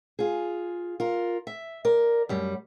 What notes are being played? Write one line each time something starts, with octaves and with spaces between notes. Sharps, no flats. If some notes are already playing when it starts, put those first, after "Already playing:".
F4 G#4
F4 A#4
E5
A#4 D5
F#2 G3